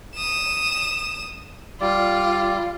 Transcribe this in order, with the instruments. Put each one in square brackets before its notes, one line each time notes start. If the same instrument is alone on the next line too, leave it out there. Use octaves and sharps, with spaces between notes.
[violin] D#6 E7
[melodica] G3 D5 [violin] F4